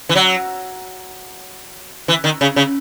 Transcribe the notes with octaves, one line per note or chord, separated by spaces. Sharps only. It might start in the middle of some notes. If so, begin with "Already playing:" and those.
E3
F#3
E3
D#3
C#3
C#3